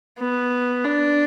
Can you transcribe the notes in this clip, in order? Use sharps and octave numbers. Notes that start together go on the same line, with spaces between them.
B3
D4